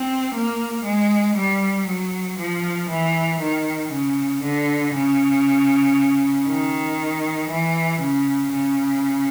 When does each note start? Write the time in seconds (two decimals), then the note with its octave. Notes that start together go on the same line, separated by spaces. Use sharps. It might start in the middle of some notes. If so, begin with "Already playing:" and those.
Already playing: C4
0.34 A#3
0.85 G#3
1.36 G3
1.87 F#3
2.39 F3
2.89 E3
3.41 D#3
3.92 C#3
4.43 D3
4.94 C#3
6.47 D#3
7.49 E3
8.01 C#3
8.52 C#3